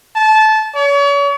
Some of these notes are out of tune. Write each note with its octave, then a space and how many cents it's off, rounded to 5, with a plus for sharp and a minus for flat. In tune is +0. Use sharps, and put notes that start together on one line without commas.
A5 -20
C#5 +40